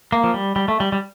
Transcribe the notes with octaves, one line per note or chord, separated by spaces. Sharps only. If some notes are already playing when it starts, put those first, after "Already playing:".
A#3
F3
G3
G3
A3
G3
G3